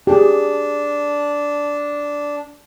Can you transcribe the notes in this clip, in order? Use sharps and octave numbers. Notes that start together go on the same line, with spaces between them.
D4 G4 G#4